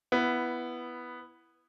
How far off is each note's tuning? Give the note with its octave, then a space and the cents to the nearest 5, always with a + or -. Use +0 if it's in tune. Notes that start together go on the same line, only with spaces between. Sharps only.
B3 +0 E4 +15